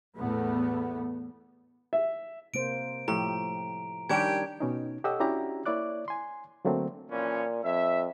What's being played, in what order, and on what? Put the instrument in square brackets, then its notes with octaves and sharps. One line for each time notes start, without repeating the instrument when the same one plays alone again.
[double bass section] E2 A2 A3 B3
[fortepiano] E5
[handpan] C3 A#3 C5 [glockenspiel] D7
[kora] A2 [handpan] F3 G4 [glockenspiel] A#5
[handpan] D#3 [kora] G3 C#4 D4 [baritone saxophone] G4 [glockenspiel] G#6 D7
[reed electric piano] B2 C#4 D#4
G4 A4 C#5 D#5 F#5 E6
C#4 D4 E4 F#4 G4 A#5
A#3 E4 C#5 D5 D6 F#6
G#5 C6
D3 F#3 A3 A#3 C4
[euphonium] A#2 [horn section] E3 F3 C#4
[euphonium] F2 [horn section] E5